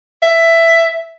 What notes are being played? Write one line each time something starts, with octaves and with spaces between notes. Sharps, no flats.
E5